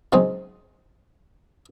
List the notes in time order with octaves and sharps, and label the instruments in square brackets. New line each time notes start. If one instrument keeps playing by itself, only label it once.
[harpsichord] C#3 F#3 G#3 C4 D#4